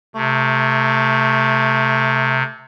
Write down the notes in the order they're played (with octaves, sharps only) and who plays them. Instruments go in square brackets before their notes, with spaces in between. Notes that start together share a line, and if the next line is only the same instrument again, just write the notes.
[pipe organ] C3 [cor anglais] A3